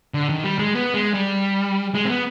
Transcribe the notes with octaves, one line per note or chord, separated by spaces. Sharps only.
D3
D#3
G3
G#3
B3
G#3
G3
G#3
C4
B3